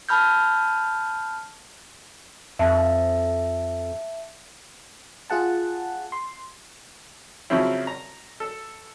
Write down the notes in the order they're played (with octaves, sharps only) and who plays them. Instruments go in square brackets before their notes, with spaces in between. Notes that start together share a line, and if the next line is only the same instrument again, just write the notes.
[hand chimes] A5 B5 F6 G6
[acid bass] F2 [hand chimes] E5 A5
[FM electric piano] F4 G#4 F#5 A5
C6
[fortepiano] C#3 F3 F#3 C4 E4
A#5
A4